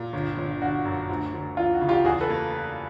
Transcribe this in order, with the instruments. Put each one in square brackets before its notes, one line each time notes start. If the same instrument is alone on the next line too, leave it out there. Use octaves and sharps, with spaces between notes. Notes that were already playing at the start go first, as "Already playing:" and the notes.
Already playing: [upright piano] A#2
G1
G1
[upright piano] D3 [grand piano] F#4
[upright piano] F#2
D2
D2
[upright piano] E3 [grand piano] F4
[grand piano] F#4
[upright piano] C#3
[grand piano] F4 G4
[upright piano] E2 [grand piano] F#4 G#4
[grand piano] A4 B4
[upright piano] A#3